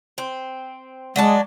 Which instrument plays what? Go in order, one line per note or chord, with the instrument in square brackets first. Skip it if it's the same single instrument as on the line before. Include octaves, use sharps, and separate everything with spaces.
[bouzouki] C4
[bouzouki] F#3 D4 A5 [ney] G#3